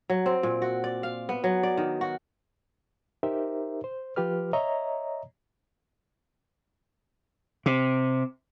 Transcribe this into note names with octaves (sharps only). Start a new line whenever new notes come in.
F#3
C4
A#2
F#4
D5
F5
B3
F#3
D5
D#3
F#4
D#4 G4 A#4 C5 E5
C5
F3 F4 G4 B4 F6
C#5 D#5 E5 A#5
C3